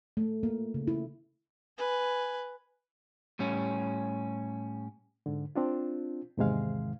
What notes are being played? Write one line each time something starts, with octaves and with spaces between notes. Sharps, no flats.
A3
A#3
C#3
E4
B4 G#5
A2 G3 C#4
G#2 D3
C4 D4 F4
E2 G#2 C3 D#3 G#3 F5